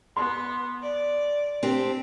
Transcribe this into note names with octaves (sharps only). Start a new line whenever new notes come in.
B3 C6
D5
C4 D4 G4